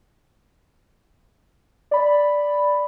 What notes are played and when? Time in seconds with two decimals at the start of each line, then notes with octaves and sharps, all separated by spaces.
1.91 D5 B5